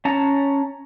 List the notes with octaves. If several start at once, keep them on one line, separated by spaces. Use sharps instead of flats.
C#4 A5 A#5